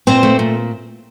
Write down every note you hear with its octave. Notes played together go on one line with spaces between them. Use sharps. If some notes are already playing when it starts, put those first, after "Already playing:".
A#2 C4 C5
A3
A#2